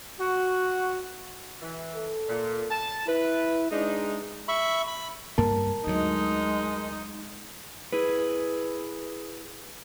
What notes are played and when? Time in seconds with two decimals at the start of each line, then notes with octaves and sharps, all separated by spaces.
0.20 F#4
1.62 E3
1.95 A4
2.28 A#2
2.70 A5
3.07 E4 B4
3.71 G#3 D4 D#4
4.48 E5 B5 C#6
4.87 B5
5.38 G2 A#3 A#4 A5
5.87 D2 F#3 G#3 D#4
7.93 E4 G#4 B4